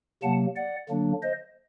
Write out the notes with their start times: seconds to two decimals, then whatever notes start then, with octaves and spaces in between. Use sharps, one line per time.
0.22 C3 F#3 A#3 F#5 A5
0.56 D5 F#5
0.89 D3 F#3 A#3 D4
1.22 C5 D#5